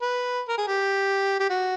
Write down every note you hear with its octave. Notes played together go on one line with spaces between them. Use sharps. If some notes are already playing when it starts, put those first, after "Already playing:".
B4
A#4
G#4
G4
G4
F#4